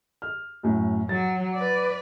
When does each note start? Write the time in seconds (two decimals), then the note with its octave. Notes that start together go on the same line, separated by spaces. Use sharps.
0.22 F6
0.63 F#2 A2
1.09 F#3 A6
1.55 B4 D5